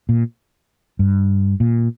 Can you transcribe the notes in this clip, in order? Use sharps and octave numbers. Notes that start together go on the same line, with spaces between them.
A#2
G2
A#2